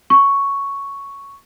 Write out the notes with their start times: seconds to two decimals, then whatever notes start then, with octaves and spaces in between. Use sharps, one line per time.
0.10 C#6